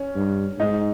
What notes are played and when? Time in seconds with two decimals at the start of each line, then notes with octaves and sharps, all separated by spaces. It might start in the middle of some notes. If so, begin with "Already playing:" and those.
Already playing: C#4
0.16 G2
0.59 G#2 D#4